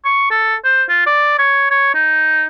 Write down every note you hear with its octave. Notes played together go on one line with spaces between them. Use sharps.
C#6
A4
C5
F4
D5
C#5
C#5
D#4